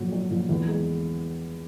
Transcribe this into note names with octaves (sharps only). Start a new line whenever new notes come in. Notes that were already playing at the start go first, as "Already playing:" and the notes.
Already playing: A#1 F#3
F#3
A#1
E2
G#3